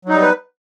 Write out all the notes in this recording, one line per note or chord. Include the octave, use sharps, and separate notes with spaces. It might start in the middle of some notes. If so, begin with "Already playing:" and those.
F#3 G3 B3 D#4 B4